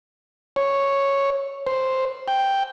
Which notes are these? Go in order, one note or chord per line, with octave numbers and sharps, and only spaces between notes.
C#5
C5
G5